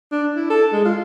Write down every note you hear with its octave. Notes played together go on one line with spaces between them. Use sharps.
D4
E4
A4
G#3
F4